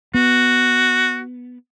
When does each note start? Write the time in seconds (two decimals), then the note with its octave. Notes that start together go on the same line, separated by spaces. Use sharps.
0.14 B3 F#4